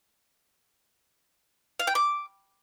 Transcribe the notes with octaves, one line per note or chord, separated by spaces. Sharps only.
F5
G5
D6